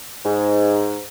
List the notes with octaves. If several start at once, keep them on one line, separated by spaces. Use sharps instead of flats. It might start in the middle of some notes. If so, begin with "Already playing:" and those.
G#2